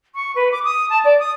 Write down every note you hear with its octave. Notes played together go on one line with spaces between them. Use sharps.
C#6
B4
D6
D#6
A5
D5
D#6